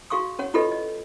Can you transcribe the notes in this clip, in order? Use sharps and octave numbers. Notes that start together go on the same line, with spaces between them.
F#4 G#4 F5 C#6 D#6
C#4 C#5 F#5
E4 F4 G4 A4 B4 D#5
D#5